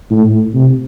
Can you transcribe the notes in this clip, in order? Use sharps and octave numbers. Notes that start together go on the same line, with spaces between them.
A2
C3